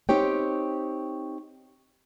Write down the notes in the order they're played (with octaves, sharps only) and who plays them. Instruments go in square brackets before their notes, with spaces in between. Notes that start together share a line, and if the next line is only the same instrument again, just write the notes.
[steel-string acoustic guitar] C4 D#4 G4 C#5 G5